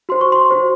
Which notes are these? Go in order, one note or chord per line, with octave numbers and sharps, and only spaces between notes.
F#4 C5 C6
C#6
C6
F#4 C5